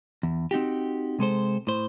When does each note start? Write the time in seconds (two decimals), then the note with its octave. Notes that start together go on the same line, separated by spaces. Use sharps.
0.23 E2
0.51 C4 D#4 F#4 G4
1.19 C3 G#3 A4 C5
1.67 A2 C5